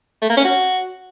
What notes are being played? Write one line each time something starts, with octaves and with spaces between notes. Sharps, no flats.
A3
A#3
C#4
F#4